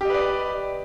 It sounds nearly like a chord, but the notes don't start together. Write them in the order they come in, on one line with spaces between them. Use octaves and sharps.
G4 D#5 B4 D5